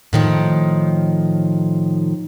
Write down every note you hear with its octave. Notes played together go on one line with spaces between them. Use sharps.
A2 D#3 F3